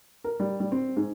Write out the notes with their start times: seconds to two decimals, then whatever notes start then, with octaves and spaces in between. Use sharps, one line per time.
0.24 A#4
0.40 G3
0.60 G3
0.72 C4
0.97 G#2